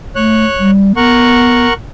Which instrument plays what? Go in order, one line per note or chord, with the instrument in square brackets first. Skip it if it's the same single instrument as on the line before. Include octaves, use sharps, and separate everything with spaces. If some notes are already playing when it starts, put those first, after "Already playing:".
[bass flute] A3 [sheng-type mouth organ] C#5 F#6
[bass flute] G3
[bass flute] B3 [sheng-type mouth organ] A#4 F#5 C#6